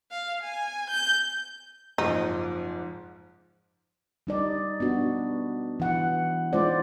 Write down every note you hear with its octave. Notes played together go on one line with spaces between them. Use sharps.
F5
G#5
G6
F#1 G#2 F3 D#4
G3 D#4 D5
B3 D4 F#4
E3 F#5
G#3 C#4 D#4 F4 C5 D5